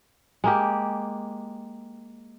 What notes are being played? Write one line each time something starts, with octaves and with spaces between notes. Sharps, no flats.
G#3 A#3 G4